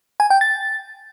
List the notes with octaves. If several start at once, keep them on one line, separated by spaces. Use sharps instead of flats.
G#5
G5
A6